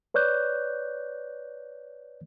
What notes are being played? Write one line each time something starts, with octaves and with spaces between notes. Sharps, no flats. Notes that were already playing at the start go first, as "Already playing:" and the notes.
B4 C#5 D5 F#6 G6